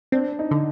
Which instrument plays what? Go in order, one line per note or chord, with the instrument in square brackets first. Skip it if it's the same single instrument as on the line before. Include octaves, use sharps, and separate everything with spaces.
[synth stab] C4 [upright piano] D4
[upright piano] D#4
[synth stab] D3